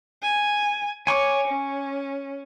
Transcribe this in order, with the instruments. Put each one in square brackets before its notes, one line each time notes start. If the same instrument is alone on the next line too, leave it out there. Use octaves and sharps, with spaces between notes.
[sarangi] G#5
[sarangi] C#5 [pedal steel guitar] G#5 C#6 D6
[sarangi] C#4